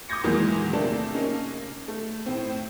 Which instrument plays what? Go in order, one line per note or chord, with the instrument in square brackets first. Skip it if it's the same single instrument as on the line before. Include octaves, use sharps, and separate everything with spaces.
[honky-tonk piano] D6 D#6 G6 G#6 A#6 C#7
E2 A#2 D#3 E3 F#3 G#3
C3 A3 A#3 D4 A4
A#3 C#4 D#4
A3
A2 C4